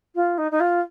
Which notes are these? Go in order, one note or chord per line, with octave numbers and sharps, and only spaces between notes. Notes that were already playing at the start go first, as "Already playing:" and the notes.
F4
D#4
D#4
F4